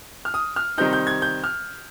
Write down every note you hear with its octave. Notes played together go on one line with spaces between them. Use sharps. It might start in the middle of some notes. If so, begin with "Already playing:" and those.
F6
D#6
F6
C3 D#3 G3 C4 D#4 G6
G6
G#6
G6
F6